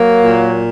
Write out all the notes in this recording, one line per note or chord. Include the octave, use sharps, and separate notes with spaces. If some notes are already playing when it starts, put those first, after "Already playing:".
Already playing: F#3 A#3
A#2